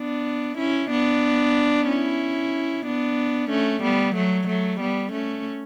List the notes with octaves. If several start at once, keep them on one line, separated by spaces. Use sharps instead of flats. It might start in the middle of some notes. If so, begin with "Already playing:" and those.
Already playing: B3 D4
C#4 E4
B3 D4
C#4 E4
B3 D4
A3 C#4
G3 B3
F#3 A3
F#3 A3
G3 B3
A3 C#4